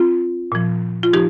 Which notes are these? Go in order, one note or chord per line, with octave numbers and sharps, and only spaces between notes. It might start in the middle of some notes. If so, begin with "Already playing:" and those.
Already playing: C4 F4
A#2 F3
F4
F3 D#4 G4